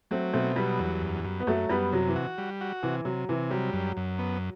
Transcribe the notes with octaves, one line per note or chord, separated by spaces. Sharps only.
F#3 A3 C4
B2 A3 C4
F#3 G3 B3
E2
F#2
F#2
B3
F#2 F#3 A3
F#2 G3 B3
C3 F#3
E3
F#4
G3
F#4
C3 E3
C3 F#3
C3 E3
F#3 G3
F#2
F#2
B3